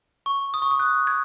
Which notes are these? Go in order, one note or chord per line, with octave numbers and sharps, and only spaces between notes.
C#6
D#6
C#6
D#6
F#6
G#6